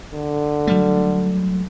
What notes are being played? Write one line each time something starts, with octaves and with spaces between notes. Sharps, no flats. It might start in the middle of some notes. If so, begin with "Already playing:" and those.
D3
F#3 G3 A3